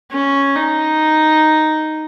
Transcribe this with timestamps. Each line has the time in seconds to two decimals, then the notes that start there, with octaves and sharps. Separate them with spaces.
0.12 C#4
0.56 D#4